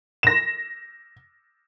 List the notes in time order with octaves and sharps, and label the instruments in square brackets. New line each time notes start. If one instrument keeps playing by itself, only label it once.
[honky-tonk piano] A#6 E7